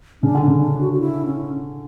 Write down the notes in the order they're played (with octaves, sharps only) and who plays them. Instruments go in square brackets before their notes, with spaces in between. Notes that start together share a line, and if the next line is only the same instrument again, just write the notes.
[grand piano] C#3 [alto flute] D4
[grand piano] D3
[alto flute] D4
[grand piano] C#3
[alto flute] D4
F#4
F#4
E4
C#4